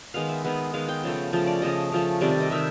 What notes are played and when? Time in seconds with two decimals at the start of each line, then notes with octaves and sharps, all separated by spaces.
0.14 D#3 G#3 B3 F5
0.29 E5
0.44 D#3 G#3 B3
0.73 D#3 G#3 B3 F5
0.89 G5
1.04 C#3 F3 A3
1.33 C#3 F3 A3
1.47 D5
1.62 C#3 F3 A3 D#5
1.92 C#3 F3 A3
2.21 C3 D#3 G3 D5
2.31 D5
2.40 D#5
2.50 C3 D#3 G3 E5